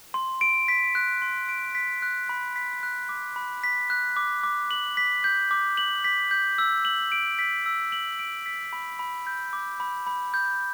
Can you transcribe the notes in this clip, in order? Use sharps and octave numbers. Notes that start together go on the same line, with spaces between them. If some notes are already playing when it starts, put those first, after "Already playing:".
C6
D7
B6
F#6
C6
D7
B6
F#6
B5
B6
F#6
D6
B5
B6
F#6
D6
D6
F#7
B6
G6
D6
F#7
B6
G6
E6
F#7
D7
B6
E6
F#7
D7
B6
B5
B5
G6
D6
B5
B5
G6